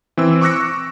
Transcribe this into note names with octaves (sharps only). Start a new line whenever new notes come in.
E3 C4 E6
C#6 D6 E6 F#6 A#6 C#7